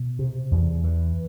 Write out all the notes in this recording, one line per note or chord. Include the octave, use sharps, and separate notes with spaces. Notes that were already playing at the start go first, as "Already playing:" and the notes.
Already playing: B2
C3
E2
E3